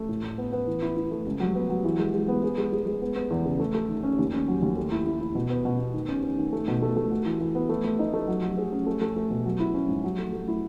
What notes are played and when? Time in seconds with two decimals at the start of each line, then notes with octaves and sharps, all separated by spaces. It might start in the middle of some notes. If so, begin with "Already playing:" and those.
Already playing: A3
0.09 A2
0.23 A2
0.38 B3
0.52 B3
0.67 E3
0.82 E4
0.96 E4
1.11 A3
1.26 C#2
1.40 F#3
1.55 B3
1.70 F#3
1.85 E3
1.99 G#3
2.14 G#3
2.28 B3
2.43 G#4
2.58 G#3
2.72 G#3
2.86 G#3
3.02 B3
3.16 B3
3.30 E2
3.45 C#3
3.60 A3
3.75 A3
3.89 D#3
4.03 C#4
4.19 D#2
4.33 C#4
4.48 F#3
4.62 D#2
4.77 A3
4.92 E4
5.07 E4
5.21 E4
5.35 B2
5.50 B3
5.65 B2
5.79 B3
5.93 D#3
6.08 C#4
6.23 C#4
6.38 D#3
6.53 A3
6.68 B2
6.82 A3
6.97 A3
7.11 F#4
7.26 E3
7.40 E3
7.55 B3
7.69 A3
7.84 A3
7.99 D#4
8.14 A3
8.28 F#3
8.42 F#3
8.57 G#4
8.72 C#4
8.87 A3
9.01 A3
9.16 A3
9.30 B2
9.45 F#3
9.60 E4
9.74 C#4
9.89 G#2
10.04 F#3
10.18 A3
10.33 A3
10.48 E4